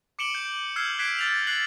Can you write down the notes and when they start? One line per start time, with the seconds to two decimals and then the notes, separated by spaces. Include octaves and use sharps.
0.19 D6 C#7 D7 E7 F#7 G7
0.35 G6
0.76 E6 F6 G6 G#6 C7 F#7
0.99 F#6 G#6 B6 C7 D7 E7
1.19 F6 A6 F7
1.47 F#6 A6 C7 F#7